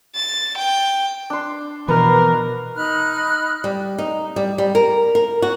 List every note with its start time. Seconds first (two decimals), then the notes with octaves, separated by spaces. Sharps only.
0.15 A6
0.58 G5
1.30 D4 C6
1.88 B2 E3 F3 A#4 B4
2.75 D#4 B5 F6 F#6
3.64 G3
3.98 D#4
4.36 G3
4.58 G3
4.75 A#4
5.15 A#4
5.42 F#4